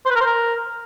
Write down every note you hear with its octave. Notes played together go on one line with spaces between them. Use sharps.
C5
B4
A#4
C5
A#4